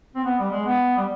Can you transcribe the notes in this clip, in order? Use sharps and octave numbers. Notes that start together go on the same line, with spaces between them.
C4
B3
G3
G#3
B3
G3